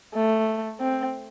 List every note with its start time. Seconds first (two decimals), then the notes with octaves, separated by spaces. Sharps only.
0.14 A3
0.80 C4